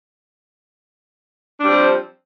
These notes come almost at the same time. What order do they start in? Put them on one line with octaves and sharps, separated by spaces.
D4 G3 C4 F3